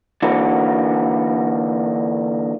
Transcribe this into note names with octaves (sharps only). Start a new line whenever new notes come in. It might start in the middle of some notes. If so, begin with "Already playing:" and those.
D3 E3 A#3 F#4